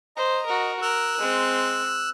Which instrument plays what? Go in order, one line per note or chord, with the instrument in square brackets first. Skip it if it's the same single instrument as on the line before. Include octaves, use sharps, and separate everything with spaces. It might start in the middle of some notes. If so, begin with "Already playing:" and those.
[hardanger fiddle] C5 [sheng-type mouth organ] D#5 A#5
[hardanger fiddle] F#4 A#4
[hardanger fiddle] A#4 [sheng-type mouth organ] E6 F#6
[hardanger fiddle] G#3 C4